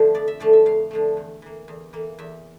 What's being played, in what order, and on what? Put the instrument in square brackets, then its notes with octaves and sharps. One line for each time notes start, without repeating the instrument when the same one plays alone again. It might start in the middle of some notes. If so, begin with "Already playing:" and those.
Already playing: [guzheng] D3 F3 A3
F2 D5
E5
D3 F3 A3 D5
E5
F2 F5
D3 F3 A3
E2
E3 A#3
E2
E3 A#3
E2 E5